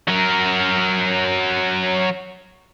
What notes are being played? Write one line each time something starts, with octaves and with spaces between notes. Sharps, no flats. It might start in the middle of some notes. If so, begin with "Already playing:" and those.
F#3 A#4